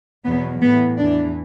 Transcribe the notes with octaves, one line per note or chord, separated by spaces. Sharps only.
E2 B2 F#3 B3
A2 E3 B3
E2 E3 D4